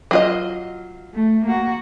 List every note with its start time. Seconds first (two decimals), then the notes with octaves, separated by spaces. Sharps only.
0.11 F#3 F4 D#5
1.14 A3
1.45 A#3 F#4